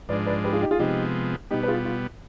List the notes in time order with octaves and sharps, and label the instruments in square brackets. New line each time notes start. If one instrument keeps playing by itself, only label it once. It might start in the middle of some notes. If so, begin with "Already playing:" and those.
[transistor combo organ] G#2 F3 G#3 D4 [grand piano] B4 D5
[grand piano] B4 D5
G4 B4
F4 G#4
D#4 G4
F4 G#4
[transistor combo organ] C3 F3 G#3 B3 [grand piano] D#4 G4
[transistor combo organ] B2 G3 B3 [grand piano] D#4 G4
[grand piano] B4
F4 G#4
F4